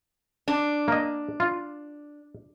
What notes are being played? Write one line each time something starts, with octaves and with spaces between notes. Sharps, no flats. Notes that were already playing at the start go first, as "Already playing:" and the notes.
D4
A#3 D#5
F4